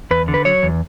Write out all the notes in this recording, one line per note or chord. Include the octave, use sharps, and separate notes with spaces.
E2 B4
D3
B4
F#3 C#5
E2